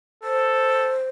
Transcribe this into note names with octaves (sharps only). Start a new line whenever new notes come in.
A4 C5